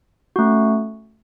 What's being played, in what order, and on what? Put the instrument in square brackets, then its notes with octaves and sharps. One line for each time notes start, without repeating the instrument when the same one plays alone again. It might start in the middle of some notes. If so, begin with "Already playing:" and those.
[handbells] A3 C#4 F#4